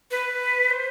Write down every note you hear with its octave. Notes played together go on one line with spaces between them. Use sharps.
B4
C5